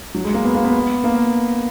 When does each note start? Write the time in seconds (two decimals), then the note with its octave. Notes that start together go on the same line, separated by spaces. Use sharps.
0.15 F#3
0.25 G#3
0.34 A#3
0.44 B3
0.54 A#3
0.64 B3
1.04 A#3